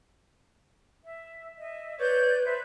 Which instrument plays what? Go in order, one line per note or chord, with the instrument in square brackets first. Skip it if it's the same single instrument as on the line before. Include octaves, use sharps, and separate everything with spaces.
[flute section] E5
D#5 E5
[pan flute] B4 [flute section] C#5 D5 G6
[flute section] B4 C5 E5